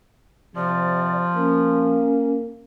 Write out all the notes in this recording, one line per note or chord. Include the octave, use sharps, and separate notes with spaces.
C3 F3 D5
A#3 C#4